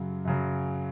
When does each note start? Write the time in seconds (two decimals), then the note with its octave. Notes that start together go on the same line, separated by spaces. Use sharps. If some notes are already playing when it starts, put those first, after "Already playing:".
Already playing: F#2 C#3 F#3
0.25 F#2 C#3 F#3